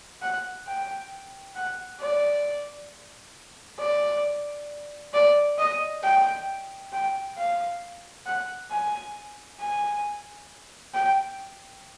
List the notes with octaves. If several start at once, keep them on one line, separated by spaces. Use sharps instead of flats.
F#5
G5
F#5
D5
D5
D5
D#5
G5
G5
F5
F#5
G#5
G#5
G5